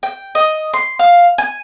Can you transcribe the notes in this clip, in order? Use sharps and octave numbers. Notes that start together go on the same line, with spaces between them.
G5
D#5
C6
F5
G#5